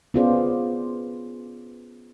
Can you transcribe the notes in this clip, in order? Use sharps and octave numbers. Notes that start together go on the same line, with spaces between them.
B3 C#4 F4 G#4 C5 D5